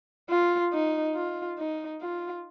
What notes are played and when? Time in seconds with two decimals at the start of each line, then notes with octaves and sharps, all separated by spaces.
0.29 F4
0.73 D#4
1.15 F4
1.58 D#4
2.01 F4